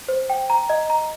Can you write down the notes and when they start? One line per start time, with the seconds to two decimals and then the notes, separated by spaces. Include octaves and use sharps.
0.08 C5
0.30 G5
0.50 A#5
0.70 D#5
0.90 A#5